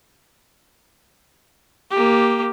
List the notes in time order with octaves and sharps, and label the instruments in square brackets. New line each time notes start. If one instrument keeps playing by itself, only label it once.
[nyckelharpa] A#3 G4